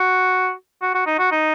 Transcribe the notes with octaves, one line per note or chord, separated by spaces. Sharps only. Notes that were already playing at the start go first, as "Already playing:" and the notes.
Already playing: F#4
F#4
F#4
D#4
F#4
D#4